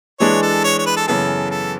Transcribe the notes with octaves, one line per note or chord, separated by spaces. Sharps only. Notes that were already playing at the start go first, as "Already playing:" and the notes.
E3 G#3 D4 C#5
A4
C#5
C#5
B4
A4
F#2 C#3 E3 B3 A4
A4